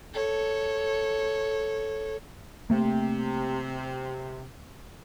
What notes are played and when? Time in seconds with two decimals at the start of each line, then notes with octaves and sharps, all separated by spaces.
0.14 A4 C#5
2.70 C3 A3 A#3